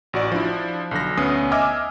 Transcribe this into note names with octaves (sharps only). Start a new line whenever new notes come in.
A1 F#4 D5
F3 D4 E4
B1 D3 A#6
D2 B3 C#4 D#6 C7
D#5 E5 G#5 D6 E6 F6